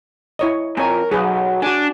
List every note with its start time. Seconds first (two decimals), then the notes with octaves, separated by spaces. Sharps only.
0.39 E4 C#5 D#5
0.77 F2 A#4 C#5 G#5
1.12 B1 F#3 G#4 B4
1.62 D4 F#4 G#5